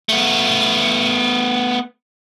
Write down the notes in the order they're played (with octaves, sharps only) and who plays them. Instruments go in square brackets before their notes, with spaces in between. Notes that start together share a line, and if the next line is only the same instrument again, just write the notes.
[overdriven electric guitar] A3 B3